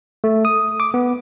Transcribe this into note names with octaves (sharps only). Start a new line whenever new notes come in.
A3
D#6
D6
B3